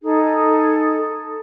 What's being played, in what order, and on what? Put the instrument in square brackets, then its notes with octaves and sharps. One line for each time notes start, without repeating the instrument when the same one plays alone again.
[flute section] D#4 G#4 A4